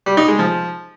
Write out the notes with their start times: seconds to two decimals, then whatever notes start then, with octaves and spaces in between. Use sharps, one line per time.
0.06 G3
0.17 D#4
0.28 G#3
0.39 F3